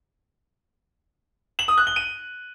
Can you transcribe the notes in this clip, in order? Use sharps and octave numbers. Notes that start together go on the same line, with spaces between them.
F#7
D#6
F#6
G7
D#7